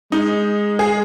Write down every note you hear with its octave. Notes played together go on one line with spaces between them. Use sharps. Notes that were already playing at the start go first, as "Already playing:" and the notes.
G#3 D#4
G#4